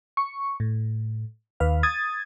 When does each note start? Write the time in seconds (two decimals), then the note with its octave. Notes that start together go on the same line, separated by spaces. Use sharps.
0.17 C#6
0.60 A2
1.60 D#2 B4 F5
1.83 D#6 G#6 A6